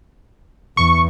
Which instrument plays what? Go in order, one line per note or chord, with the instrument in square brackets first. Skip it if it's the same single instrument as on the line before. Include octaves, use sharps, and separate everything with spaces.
[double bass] E2 [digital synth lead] C#6